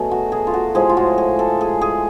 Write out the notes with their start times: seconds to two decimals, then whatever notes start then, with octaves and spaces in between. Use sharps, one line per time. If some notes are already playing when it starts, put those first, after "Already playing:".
Already playing: B2 F#3 A3 G#4
0.11 F#4
0.32 G#4
0.47 F4
0.54 F#4
0.75 A2 F3 G#3 G#4
0.89 F4
0.97 F#4
1.18 G#4
1.39 A4
1.61 G#4
1.81 G#4